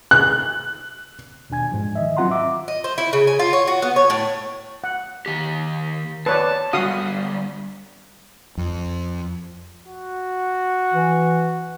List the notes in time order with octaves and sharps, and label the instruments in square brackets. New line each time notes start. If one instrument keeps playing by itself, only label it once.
[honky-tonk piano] F#6
[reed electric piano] D#2 B2 D4 G#5 G#6
G#2 F3
D#3 D#5 E5
F#3 C4 F4 F#5 A#5 C6
E5 D6 E6
[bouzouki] D#5
C5
E4
C#3
G#5
F4
C#5
F#4
B3
C#5
A2
[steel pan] F#5
[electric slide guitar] D#3 G4
[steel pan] B4 C#5 D5 [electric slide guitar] A5
[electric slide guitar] D3 G3 [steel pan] F#4 F5 D#6
[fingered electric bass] F2
[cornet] F#4
[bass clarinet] E3